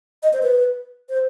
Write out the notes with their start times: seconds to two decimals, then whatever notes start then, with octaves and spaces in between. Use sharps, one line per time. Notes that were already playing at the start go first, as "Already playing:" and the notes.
0.23 D#5
0.33 C5
0.43 B4
1.09 C5